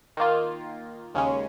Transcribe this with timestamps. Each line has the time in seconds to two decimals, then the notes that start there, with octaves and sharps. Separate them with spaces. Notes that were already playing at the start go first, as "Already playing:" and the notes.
0.17 D#3 A#3 F4
1.15 D#2 C#3 G#3 C#4